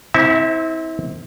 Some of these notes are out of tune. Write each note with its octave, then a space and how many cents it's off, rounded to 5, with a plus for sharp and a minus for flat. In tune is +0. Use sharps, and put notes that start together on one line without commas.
C4 +0 E4 -35 E5 +0